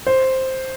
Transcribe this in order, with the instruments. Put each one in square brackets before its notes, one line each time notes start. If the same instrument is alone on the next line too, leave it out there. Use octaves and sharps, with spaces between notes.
[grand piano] C5